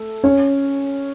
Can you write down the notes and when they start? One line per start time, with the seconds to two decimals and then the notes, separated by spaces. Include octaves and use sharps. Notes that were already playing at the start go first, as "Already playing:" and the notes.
Already playing: A3 A4
0.24 C#4 C#5